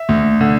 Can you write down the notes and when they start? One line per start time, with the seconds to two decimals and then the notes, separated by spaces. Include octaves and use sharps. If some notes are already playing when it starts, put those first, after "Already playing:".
Already playing: E5
0.09 D2
0.41 D3